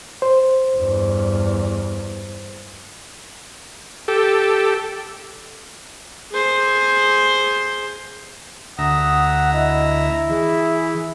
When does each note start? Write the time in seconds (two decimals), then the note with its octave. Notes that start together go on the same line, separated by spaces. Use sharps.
0.22 C5
0.76 E2 G2
4.08 G4 A4
6.32 G#4 C5
8.78 D2 E5 F#5 A#5 D#6
9.53 E4 D#5
10.29 E3 G#4